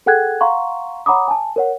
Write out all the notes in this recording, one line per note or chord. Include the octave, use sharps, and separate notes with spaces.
G#4 A4 F#5 G5 F#6 G#6
F5 F#5 A#5 C6 C#6
C#5 F#5 A#5 B5 D6 D#6
G#5 A5
A#4 C#5 F#5